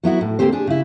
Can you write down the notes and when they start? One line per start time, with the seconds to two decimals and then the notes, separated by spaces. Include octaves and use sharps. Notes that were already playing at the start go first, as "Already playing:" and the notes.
0.03 F#3 B3 E4 F#4
0.21 A2
0.39 D2 G#2 A#3 C4 G4 C5
0.52 D4 G#4
0.67 C#3 E4